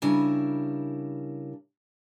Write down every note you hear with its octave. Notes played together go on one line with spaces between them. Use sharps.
C#3 G3 D4 E4 A#4 G#5